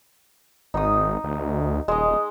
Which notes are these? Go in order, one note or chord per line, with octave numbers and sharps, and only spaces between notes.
G#1 D#4 D#6
D2
D#1 G#3 D#5